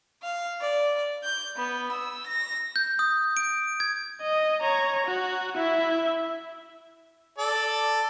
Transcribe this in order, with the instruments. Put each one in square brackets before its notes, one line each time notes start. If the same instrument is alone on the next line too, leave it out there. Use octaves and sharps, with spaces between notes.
[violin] F5
D5
G6
B3
E6
A#6
[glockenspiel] G6
D#6
D7
G#6
[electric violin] D#5
C#5 A#5
F#4
E4 E5
[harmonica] A4 D5